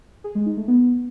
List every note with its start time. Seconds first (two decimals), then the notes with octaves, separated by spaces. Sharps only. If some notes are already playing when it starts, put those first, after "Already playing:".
0.24 G#4
0.35 G#3
0.46 D#4
0.57 A3
0.68 B3